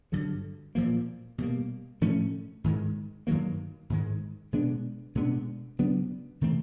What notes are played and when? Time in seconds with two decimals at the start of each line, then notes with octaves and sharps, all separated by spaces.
0.12 G2 D3 F#3
0.75 A#2 F3 A#3
1.38 B2 G3 A#3
2.01 A2 F3 A3 C#4
2.64 G#2 D#3 G#3
3.27 G2 D#3 F#3 A#3
3.90 G#2 D#3 G#3
4.53 B2 G#3 B3 D4
5.15 B2 G#3 B3 D4
5.79 C#3 F#3 B3 D4
6.41 C3 E3 A3 C4